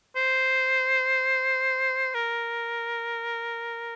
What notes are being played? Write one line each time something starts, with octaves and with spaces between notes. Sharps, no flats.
C5
A#4